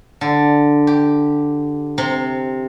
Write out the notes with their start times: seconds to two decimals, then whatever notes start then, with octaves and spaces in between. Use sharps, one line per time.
0.21 D3
0.87 G4
1.98 C3